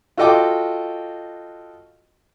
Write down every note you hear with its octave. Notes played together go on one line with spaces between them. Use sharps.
F4 F#4 A4 D#5 G5 D6